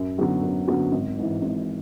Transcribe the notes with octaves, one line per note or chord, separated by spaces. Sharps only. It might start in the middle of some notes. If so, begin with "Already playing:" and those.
Already playing: F#2
D3 F#3 B3 F#4
F#2
D3 F#3 B3 F#4
G#1
G#2 E3
G#1